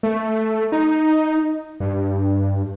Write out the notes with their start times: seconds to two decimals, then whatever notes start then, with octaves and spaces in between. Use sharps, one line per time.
0.03 A3
0.72 D#4
1.80 G2